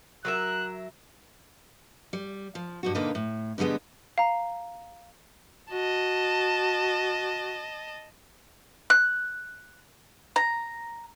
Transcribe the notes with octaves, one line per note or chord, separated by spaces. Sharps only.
F#3 A#4 E5 F#6
G3
F3
G2 B2 F#4
A#2 D3 A#3 D#4 B4
A2
B2 D3 G3 G#3 B3
F5 A#5
F#4 D#5 A5
F#6
A#5